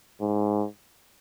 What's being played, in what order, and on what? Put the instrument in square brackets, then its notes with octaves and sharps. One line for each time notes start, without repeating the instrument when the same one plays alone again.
[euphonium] G#2